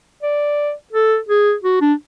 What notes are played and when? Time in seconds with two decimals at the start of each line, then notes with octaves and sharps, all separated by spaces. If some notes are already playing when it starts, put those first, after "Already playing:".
0.23 D5
0.93 A4
1.29 G#4
1.64 F#4
1.81 D4